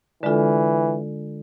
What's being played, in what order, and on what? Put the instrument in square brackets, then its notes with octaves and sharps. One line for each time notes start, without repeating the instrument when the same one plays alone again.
[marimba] D3 G#3 D4 F4 A4 [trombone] E3